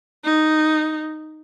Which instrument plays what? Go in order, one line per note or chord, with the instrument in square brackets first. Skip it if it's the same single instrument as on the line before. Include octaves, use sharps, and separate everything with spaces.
[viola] D#4